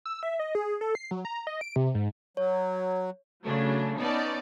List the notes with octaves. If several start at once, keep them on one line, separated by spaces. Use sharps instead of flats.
E6
E5
D#5
G#4
A4
C7
F#3
A#5
D#5
D7
C3
G#2
F#3 C#5
C#3 F#3 A3 D4
B3 C#4 D#4 D5 A5